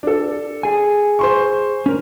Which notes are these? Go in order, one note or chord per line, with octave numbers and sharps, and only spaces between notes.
D4 A4
G#4 G#5
C5 C6 C#6
C#4 A#4